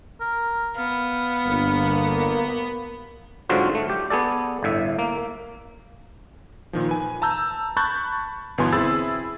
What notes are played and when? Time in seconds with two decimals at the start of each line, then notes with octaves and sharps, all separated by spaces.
0.20 A#4
0.76 B3 F5
1.45 G1 A#3
3.49 G#2 D3 F#3 C4 F4 F#4
3.75 A3
3.90 G4
4.10 B3 G#4 A4 D5
4.63 G1 A2 E5
4.99 A#3
6.73 A#2 D#3 F3
6.89 B4 G#5
7.22 A5 A#5 E6 G6
7.77 A5 B5 C#6 F#6 G6 A6
8.58 G1 B2 E3 B3 G#5 C6
8.73 C4 E4 G#4 B5 E6 A6